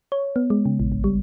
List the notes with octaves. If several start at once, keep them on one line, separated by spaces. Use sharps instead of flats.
C#5
B3
G#3
C#3
A#1
G#1
G3